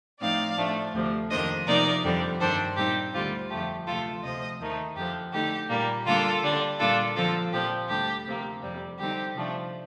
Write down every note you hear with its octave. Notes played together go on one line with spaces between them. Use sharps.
A2 F3 A3 C4 D#4 D5 F5
A2 F3 A3 D4
D2 C3 F3
F2 D#3 A#3 D4 C5 D#5
C3 F3 A#3 D#4 A#4 D5
F2 D3 G3 C4
G2 D#3 G3 D4 A4 C5
A#2 G3 C4 D#4 G4
D2 D3 G3 C4 F4
F2 D3 F3 A3 G4
D2 C3 F3 A3 F4 A4
D2 C3 F3 C5 D#5
D#2 D#3 A3 D#4
F2 D3 F3 G4
D3 A3 D#4 G4
A#2 G3 A#3
D3 G3 A#3 D4 F4 A4
D3 G3 D4
A#2 G3 A#3 D4 F4 A4
D3 F3 C4 F4 A4
A#2 F3 C4 G4
D2 D3 G3 D4 G4
D2 C3 F3 A#3
F2 C3 G3
D3 G3 C4 D#4 G4
C3 F3 A3 D4